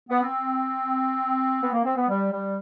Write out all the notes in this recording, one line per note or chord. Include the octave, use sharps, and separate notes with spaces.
B3
C4
B3
A#3
C4
B3
G3
G3